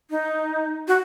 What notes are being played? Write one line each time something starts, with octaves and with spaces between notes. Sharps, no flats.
D#4
F#4